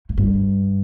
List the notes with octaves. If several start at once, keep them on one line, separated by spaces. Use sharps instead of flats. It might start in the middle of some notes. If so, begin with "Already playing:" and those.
A2
G2